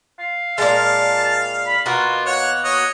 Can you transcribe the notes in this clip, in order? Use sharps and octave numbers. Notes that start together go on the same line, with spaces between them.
F5
A#2 G#3 F5 A5
B5
B2 A#3 F4 F#4
C#5 F#5
C#5 D#5